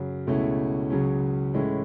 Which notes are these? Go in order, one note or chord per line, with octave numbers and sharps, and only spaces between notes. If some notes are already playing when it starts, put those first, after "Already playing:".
Already playing: F#2 C#3 F#3
C#2 B2 A3 C#4 E4
C#2 C#3 F#3 C#4
A2 E3 G#3 C#4 E4